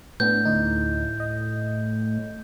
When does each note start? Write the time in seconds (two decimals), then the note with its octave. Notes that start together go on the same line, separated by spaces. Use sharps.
0.20 A2 B3 D4 G6
0.45 D2 D#4
1.20 D#5